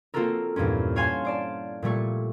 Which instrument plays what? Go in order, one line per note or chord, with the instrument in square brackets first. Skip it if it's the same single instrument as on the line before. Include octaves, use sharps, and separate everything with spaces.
[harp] A#3 C4 F4 F#4 A4 A#4
E2 G2 A#2 C4 C#4
C#5 F5 F#5 G#5 A5 C6
C5 D5 A5
A#2 G3 A3 C#6